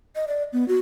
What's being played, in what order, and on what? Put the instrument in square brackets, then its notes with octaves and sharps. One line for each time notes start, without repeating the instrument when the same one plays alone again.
[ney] D#5
D5
B3
F#4